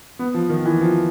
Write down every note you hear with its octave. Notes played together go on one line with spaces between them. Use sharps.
B3
F3
D#3
E3
F3